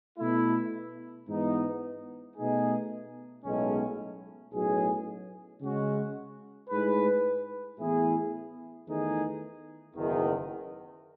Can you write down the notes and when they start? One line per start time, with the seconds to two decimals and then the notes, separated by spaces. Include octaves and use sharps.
0.19 B2 A3 E4
1.27 G#2 E3 B3 D#4
2.36 B2 A3 D#4 G#4
3.44 B1 A2 G#3 C#4
4.53 B1 A2 F#3 C#4 G#4
5.61 C#3 G#3 C#4 F#4
6.70 A2 G#3 D#4 G#4 B4
7.78 A2 E3 B3 E4 G#4
8.87 E2 D#3 A3 D#4 G#4
9.95 F#1 E2 D#3